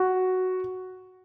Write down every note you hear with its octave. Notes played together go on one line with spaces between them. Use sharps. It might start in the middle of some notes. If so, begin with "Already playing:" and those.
Already playing: F#4